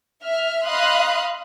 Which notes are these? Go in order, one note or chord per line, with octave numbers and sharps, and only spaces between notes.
E5 F6
D#5 F5 B5 C6 D#6 F#6